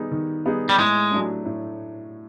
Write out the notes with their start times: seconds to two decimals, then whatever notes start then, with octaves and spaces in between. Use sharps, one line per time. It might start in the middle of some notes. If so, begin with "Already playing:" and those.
Already playing: D#3 G3 B3 D#4 G#4
0.12 D#3
0.45 G3 B3 D#4 G#4
0.69 G3
0.79 A2 G#3
1.11 F#3 A3 D4
1.45 A2